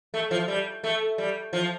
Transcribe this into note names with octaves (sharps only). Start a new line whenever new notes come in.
A3
F3
G3
A3
G3
F3